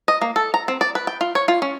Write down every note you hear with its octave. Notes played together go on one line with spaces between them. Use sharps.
D#5
A#3
A4
A#5
C4
D5
B4
G5
F4
C#5
F4
C#4